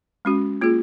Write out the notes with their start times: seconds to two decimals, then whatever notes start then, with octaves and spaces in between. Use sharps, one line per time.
0.25 G#3 C#4 F#4
0.61 A#3 F4 G#4